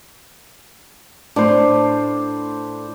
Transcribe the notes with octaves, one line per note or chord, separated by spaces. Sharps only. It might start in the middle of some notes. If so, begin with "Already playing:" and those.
A2 D4 C5